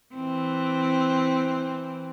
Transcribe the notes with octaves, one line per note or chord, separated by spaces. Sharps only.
E3 C4